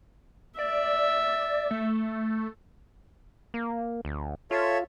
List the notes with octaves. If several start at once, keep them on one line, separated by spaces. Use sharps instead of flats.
D5 E5
A3
A#3
D2
F4 A4 C#5 E5